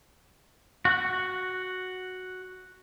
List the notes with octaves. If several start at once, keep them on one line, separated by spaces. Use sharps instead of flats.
F#4 F#5 F#6